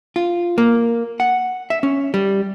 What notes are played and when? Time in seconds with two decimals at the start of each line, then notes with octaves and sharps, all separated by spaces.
0.16 F4
0.58 A#3
1.20 F#5
1.70 E5
1.83 C#4
2.14 G3